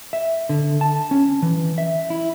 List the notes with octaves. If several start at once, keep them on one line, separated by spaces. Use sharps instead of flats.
E5
D3
A5
C#4
E3
E5
E4